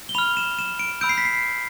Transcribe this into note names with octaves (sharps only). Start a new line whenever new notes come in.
G7
B5 F6 F7
E7
E7
D7
B5 E6 G6 D7
C7
B6
C7